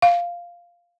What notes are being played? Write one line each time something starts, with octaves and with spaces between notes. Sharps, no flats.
F5